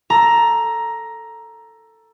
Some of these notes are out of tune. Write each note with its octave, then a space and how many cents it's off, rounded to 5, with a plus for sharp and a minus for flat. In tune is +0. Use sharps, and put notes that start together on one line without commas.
A4 +10 A#5 +10